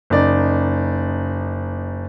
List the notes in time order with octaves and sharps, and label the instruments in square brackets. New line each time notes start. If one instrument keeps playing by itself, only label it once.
[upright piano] F#1 D#4 D5